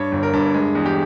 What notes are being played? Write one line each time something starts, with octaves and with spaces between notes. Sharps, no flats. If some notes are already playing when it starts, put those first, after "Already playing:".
Already playing: G2 C#5
G1
A#4
G2
G#3
E2
G4